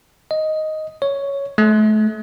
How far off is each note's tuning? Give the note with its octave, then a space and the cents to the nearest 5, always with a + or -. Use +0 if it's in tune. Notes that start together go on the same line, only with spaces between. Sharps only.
D#5 +5
C#5 +5
A3 -35